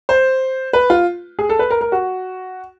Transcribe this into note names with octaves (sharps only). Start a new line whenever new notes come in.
C5
B4
F4
G#4
A4
B4
A#4
A#4
F#4